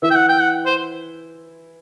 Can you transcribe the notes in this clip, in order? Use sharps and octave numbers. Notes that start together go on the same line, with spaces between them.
E3 E4 E5
G5
F#5
G5
F#5
C5